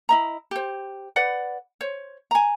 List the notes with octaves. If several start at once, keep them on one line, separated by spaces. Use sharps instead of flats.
E4 D#5 A#5
G4 C5
B4 D5 F#5
C5 C#5
G#5 A#5